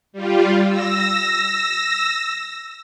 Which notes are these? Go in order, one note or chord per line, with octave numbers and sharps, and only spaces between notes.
G3 F4
E6 A#6